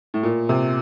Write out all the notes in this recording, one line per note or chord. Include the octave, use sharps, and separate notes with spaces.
A2
A#2
C3